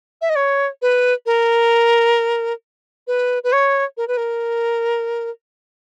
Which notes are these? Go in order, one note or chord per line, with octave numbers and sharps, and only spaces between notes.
E5
D#5
C#5
B4
A#4
B4
B4
C#5
A#4
B4
A#4